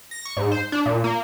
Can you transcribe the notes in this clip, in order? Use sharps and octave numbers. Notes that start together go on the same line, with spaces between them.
A#6
C#6
G#2
C5
D4
A#2
A#3